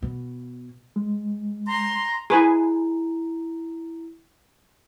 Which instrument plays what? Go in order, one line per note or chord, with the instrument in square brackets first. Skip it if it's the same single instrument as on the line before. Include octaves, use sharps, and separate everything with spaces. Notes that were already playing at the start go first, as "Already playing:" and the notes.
[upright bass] B2
[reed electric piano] G#3
[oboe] A#5 [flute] C6
[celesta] E4 A#5 [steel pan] G#4 B4 G#5